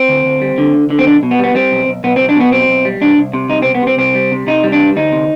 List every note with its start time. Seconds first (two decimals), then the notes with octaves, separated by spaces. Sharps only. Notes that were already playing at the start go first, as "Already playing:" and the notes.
Already playing: C4
0.09 D2
0.25 D2
0.41 G3
0.58 D3
0.74 D2
0.90 D3
0.99 C4
1.06 B1 D4
1.23 B2
1.31 B3
1.39 G3
1.44 B3
1.55 G3 C4
1.72 B1
1.88 B1
2.04 B1 B3
2.16 B1 C4
2.29 D4
2.36 B2 B3
2.52 B1 C4
2.69 B1
2.85 G3
3.01 C2 D4
3.18 C2
3.33 C3
3.49 C2 D#4
3.62 C2 C4
3.75 B3
3.82 C3 C4
3.98 C2 C4
4.15 G3
4.32 C3
4.47 C3 D#4
4.63 G3
4.72 D4
4.80 C2
4.96 D2 D#4
5.12 C3